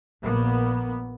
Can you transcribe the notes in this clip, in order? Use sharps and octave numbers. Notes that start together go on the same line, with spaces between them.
A#1 A#2 A#3 B3